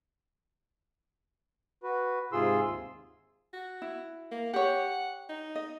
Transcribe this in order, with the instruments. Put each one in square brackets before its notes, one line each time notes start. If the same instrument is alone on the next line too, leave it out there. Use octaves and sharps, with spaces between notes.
[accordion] F#4 B4
G#2 C3 F4 G#4 C6 E6
D#2
[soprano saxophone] F#4
[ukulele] E4
[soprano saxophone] A#3
[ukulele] G4 C#5 [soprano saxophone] F#5
[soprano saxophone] D#4
[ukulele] D#5